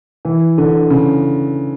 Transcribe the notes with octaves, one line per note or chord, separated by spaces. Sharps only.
E3
D3
C#3